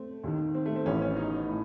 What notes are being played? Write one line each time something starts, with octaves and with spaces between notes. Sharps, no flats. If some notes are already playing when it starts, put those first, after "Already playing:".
Already playing: A3 C4
D#2 D#3
C4
A3
C4
A1 A2 E3 C#4
C#4
D#4
A2